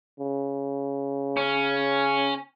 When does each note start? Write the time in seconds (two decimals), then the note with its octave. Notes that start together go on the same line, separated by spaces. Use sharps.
0.20 C#3
1.37 C#4